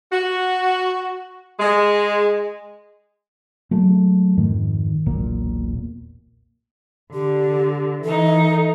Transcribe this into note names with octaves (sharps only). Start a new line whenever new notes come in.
F#4
G#3
F#3 G#3 A3
F2 G#2 D#3
E1 B1 A#2 A#3
D3 G4
E3 D#4 A4